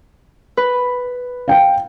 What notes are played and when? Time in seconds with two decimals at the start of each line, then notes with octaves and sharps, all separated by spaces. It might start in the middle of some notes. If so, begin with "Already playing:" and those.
0.57 B4
1.48 F5 G5